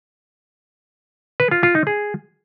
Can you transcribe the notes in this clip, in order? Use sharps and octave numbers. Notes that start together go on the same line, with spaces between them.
B4
F4
F4
D#4
G#4